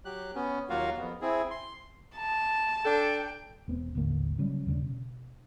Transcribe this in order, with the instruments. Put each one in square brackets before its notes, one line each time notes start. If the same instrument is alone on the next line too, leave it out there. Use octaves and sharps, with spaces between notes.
[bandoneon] F#3 G4 F#6
B3 C#4
D#2 F#3 A#3 F4 F#4 F5
F2 B3
C4 E4 G#4
C6
[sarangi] A5
[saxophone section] D4 A4 [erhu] G5
[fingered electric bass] E1 B3 C4
D#1 A1 D3 A#3
C#3 F#3 G3 C#4
E2 C#3 D4
B2